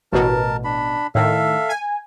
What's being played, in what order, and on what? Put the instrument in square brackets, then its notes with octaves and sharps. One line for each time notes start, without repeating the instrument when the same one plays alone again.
[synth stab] A1 B2 [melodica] A#4 A5
[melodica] D4 B5
[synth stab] A2 D#3 [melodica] A4 E5 F5
[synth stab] G#5